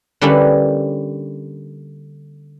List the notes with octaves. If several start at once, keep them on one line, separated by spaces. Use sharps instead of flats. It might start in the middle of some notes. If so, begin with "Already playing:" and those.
D3 G3 A#3 C#4 E4 B4